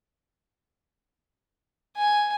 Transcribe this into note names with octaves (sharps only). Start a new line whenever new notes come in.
G#5